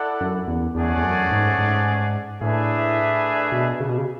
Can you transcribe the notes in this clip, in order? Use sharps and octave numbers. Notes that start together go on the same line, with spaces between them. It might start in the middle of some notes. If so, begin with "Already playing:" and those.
Already playing: E4 A4 D5 F#5
F#2
E2
E2 A3 C#4 G#4 D5 F#5
E2
F#2
G#2
G#2
A2 A3 D4 G#4 B4 E5
B2
C#3
B2
C#3